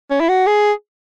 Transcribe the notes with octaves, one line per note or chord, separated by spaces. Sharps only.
C#4
E4
F#4
G#4